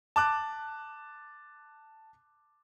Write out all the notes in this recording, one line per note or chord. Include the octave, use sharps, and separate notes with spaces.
A5 D6 F#6